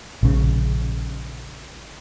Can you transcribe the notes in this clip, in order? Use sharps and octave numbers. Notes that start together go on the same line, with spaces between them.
A#1 C#3